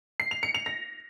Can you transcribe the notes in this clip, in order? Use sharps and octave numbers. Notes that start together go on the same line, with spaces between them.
C7
F7
C#7
F7
A#6